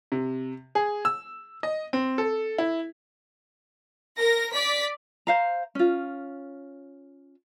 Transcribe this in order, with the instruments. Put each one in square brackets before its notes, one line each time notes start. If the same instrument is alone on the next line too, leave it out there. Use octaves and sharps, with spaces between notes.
[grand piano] C3
G#4
E6
D#5
C4
A4
E4
[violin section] A#4 A#6
D5 B6
[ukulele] C5 F5 A#5
C#4 F4